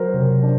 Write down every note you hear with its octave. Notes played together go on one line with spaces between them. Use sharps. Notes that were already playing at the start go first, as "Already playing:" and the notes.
Already playing: F#3 A#4 C5
C3
D4